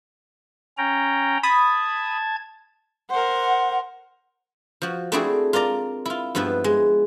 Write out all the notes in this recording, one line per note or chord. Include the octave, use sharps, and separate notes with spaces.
C#4 G5 A#5
A5 B5 D#6 G#6
A#4 C5 F#5
F3 F#4
A3 C4 D4 E4 F#4 G#4
F4 A#4 D5 A#5
E4 F4
G2 F3 B3 E4 B4
G#3